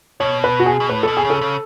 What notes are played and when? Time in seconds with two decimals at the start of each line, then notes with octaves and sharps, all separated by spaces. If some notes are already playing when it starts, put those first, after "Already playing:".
0.20 B2 C#5
0.44 B4
0.60 F#4
0.66 G#4
0.80 B2
0.89 A2 B4
1.03 B2 A4
1.17 G#4
1.25 C#3
1.30 A4
1.41 C#3